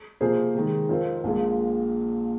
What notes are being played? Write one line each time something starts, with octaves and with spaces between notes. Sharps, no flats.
C3 F3 A#3 G#4 C5
C3 D#3 G#3
F2 F3 C4 F4 A#4
A#1 A#2 G#3